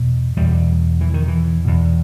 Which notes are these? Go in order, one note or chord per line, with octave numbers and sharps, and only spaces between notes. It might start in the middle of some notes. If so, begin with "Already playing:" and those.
Already playing: E2 B2
E2 B2 G3
E3
D#3
E3
E2 B2